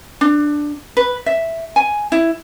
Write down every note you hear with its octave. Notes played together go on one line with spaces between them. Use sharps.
D4
B4
E5
G#5
E4